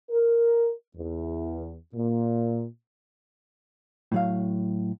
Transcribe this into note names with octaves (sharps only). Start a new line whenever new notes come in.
A#4
E2
A#2
A2 F#3 F5